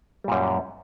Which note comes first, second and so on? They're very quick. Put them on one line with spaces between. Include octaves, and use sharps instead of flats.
G3 A#2 F#2